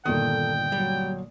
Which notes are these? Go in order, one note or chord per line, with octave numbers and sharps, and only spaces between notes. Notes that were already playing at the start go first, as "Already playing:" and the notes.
G1 D#2 A#2 D#3 A4 G5 D#6
F#3 G3